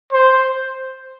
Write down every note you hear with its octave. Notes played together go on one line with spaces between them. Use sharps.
C5